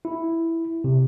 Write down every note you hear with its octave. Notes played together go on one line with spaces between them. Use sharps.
E4
C3